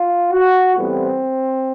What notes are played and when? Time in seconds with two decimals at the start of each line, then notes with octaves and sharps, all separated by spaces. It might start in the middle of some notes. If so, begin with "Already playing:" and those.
Already playing: F4
0.32 F#4
0.76 A2 E3 G3 B3 C4